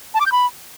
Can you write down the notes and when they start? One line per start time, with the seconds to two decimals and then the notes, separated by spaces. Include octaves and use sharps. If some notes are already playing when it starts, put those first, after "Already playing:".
0.14 A5
0.20 D6
0.26 G6
0.32 B5